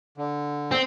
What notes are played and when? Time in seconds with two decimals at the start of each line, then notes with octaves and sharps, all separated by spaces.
0.18 D3
0.72 C4